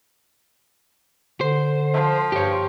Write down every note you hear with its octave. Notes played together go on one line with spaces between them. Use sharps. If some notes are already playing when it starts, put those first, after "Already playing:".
D3 C5
F3
G2 G4 C#5